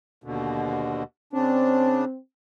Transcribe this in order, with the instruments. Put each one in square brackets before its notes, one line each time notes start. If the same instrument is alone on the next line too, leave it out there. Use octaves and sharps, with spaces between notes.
[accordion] D#2 B2 D3
[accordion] C#3 D4 [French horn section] C4